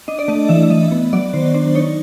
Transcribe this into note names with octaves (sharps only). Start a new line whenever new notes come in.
D4 D#5
D5
A3 D#5
E3 E5
E5
E3 D#5
B3
F#3 D5
D#3 C5
D4 C5
D#4 C#5